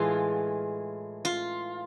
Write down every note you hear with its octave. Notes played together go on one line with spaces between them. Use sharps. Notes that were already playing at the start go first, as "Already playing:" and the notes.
Already playing: A2 E3 G#3 F4
F4